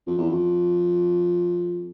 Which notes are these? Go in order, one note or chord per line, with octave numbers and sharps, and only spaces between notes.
F2
E2
F2